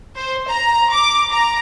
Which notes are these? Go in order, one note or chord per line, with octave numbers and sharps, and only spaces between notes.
C5
A#5
D6
A#5